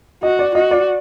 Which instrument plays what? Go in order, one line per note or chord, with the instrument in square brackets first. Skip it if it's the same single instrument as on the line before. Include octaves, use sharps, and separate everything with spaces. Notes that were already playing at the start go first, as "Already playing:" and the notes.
[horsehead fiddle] F#4 [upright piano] D#5
[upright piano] D5
[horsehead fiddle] F#4 [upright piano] D#5
[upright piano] D5